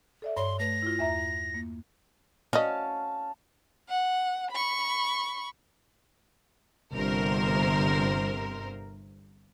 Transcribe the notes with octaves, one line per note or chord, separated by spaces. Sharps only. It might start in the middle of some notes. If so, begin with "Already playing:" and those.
A4 D5 E5
G2 C#5 C6
A3 B4 A#6
E4 F4
E2 E5 A#5
A#3
C#4 F#4 D#5 F5 A5
F#5
B5 C#6
G1 C3 A#4 C5